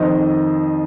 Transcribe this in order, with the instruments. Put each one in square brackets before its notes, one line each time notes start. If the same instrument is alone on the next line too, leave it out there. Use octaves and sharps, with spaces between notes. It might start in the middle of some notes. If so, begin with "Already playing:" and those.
Already playing: [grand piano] F2 D#3 C5 D#5